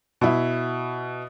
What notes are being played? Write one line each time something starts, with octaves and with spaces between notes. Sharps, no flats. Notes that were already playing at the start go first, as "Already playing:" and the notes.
B2 E4